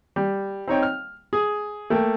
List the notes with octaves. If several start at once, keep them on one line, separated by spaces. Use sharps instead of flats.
G3
C4 D#4 C#5 G5
F6
G#4
A3 A#3 G5